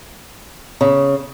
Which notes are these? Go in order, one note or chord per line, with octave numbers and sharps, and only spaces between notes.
C#3